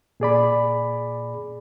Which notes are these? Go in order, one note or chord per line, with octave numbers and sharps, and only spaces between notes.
A#2 G#4 D5 B5